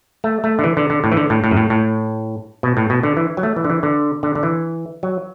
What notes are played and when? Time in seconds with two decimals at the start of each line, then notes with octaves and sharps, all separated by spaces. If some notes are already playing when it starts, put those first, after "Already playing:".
0.24 A3
0.44 A3
0.59 D3
0.64 E3
0.77 D3
0.90 D3
1.04 A2
1.12 E3
1.17 D3
1.30 A2
1.44 A2
1.51 F#2
1.57 A2
1.70 A2
2.63 B2
2.77 A2
2.90 B2
3.03 D3
3.17 E3
3.37 F#3
3.43 A3
3.56 E3
3.64 D3
3.70 E3
3.83 D3
4.23 D3
4.35 D3
4.43 E3
5.03 F#3